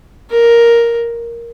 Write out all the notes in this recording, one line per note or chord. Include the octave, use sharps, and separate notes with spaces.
A#4